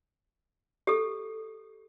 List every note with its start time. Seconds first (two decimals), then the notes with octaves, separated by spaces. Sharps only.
0.87 G4 A4